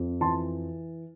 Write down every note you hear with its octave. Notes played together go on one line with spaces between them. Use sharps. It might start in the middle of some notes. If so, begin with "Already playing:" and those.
Already playing: F2
E3 A5 C6